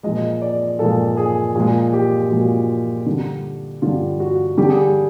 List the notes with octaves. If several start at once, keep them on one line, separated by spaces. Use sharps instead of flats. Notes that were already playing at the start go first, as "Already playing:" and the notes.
A#2 F3 G#3 D#5
D5
A#2 F3 G#3 A4
G#4
A#2 F3 G#3 G#4
G4
A#2 F3 G#3 F#4
D3 G3
D3 G3 F4
F#4
D3 G3 G4
G#4
G4